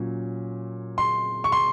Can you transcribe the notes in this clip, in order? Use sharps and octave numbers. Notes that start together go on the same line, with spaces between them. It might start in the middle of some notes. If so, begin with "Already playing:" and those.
Already playing: A#2 F#3 C#4
C6
C#6
C6